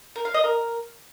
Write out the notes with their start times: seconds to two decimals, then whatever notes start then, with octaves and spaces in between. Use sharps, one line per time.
0.16 A#4
0.25 F5
0.34 D#5
0.44 A#4